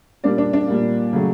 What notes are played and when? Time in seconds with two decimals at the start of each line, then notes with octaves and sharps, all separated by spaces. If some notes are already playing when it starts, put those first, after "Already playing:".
0.24 A#2 G3 A#3 D4 D5
0.38 D4 D5
0.53 D4 D5
0.68 A#2 G3 A#3
1.13 C#3 F#3 A3